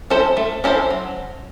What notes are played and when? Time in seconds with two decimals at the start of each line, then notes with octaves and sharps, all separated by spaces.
0.10 C#4 E4 A4 C5
0.37 A3
0.64 C#4 E4 A4 C5
0.90 F#3